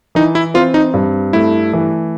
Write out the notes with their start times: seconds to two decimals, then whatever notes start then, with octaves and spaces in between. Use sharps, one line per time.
0.15 E3 D#4
0.35 E4
0.54 C4 F4
0.74 D#4
0.94 G2
1.33 A3 E4
1.73 E3